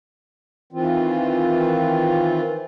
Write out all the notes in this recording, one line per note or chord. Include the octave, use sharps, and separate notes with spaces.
D#3 E3 C4 F4